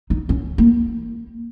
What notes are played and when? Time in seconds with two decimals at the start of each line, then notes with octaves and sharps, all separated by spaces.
0.10 D#4
0.29 C#4
0.58 A#3